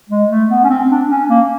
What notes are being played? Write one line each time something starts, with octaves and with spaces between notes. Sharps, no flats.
G#3
A3
B3
C#4
C4
D4
C#4
A#3